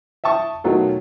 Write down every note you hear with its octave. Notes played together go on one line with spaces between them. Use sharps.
E5 G5 A5 C#6 D#6
B2 D#3 F#3 A3 C#4 F4